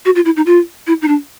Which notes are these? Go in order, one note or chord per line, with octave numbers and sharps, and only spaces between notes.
F#4
F4
E4
D#4
F4
E4
D#4
D4